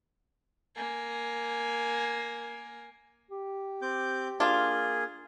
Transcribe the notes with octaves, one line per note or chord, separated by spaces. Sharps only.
A#3 G#5
G4
C4 D6 G6
A#3 D4 F4 G#4